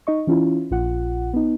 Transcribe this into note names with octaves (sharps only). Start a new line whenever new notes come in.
D#4 D#5 C#6
E3 C#4 E4 F4
A#1 F4 F#5
B3 D#4